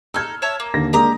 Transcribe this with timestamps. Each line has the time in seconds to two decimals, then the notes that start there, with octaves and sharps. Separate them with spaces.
0.14 D#4 A4 E6 F6 G#6
0.42 C#5 E5 A5
0.60 A#3
0.74 D#2 D3 A#6
0.93 G#3 A#3 D4 G4 A#5 D#6